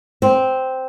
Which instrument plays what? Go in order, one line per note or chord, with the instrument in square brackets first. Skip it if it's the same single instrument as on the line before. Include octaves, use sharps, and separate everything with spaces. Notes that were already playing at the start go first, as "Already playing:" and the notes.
[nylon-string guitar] C4